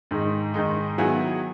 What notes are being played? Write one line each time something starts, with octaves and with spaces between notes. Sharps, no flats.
G#2 D#3 G#3 D#4
G#2 D#3 G#3 D#4
D#3 F#3 B3 E4 G#4